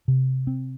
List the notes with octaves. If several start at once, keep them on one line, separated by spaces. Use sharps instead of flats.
C3
C4